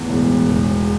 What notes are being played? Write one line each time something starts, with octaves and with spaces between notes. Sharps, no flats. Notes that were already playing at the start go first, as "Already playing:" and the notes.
Already playing: E2 A2
E1
E1